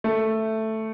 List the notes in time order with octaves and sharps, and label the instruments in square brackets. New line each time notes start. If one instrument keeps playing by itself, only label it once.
[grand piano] A3